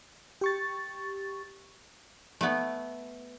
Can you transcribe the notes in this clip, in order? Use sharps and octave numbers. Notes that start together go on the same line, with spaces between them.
G4 C#6 A6
A3 B3